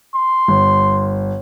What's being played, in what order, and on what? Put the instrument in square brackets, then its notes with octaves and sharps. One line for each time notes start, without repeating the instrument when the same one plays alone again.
[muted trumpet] C6
[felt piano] G1